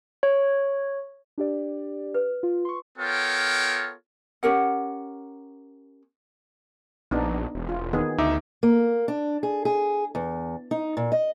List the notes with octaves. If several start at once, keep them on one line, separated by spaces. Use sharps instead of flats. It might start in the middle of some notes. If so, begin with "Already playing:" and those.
C#5
D4 G4 D5
B4
F4
C6 C#6
B3 F4 A4 A#4 C#5 G5
C#4 G4 A#4 F#5
A#1 B3 D4 D#4
E1
F4
D#3 B3 G#4
D2 D#4 E5 D6
A#3
D4
G#4
G#4
E2
D#4
A#2
D#5